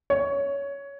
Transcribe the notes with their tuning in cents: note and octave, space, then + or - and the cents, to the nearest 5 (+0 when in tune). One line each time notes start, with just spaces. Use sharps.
C#5 +15